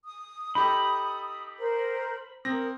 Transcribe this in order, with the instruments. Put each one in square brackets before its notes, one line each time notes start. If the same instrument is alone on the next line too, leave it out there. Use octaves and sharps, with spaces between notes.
[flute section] D#6
[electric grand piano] D#4 G4 A4 [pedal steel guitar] B5
[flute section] A#4 C5
[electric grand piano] C4 A#6 [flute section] A#4 D#6